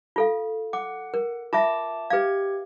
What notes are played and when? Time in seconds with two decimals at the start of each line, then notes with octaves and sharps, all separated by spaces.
0.16 F4 A4 F5
0.73 F#5 D6
1.14 A#4
1.53 F4 E5 A5 D6
2.10 G4 B4 F5 G#6